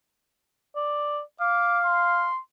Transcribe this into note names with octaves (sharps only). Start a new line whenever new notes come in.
D5
F5 D6
C6